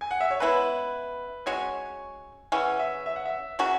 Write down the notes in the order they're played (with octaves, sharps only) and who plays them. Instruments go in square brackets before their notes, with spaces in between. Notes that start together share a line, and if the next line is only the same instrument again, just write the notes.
[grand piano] G#5
F#5
E5
C#5
[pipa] C#3 G#3 B3 E4 [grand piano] B4
[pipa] G#3 C#4 F#4 C#5 [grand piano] G#5
[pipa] C#3 E3 C#4 [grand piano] F#5
[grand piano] E5
E5
F#5
E5
[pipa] C#3 F#3 C#4 F#4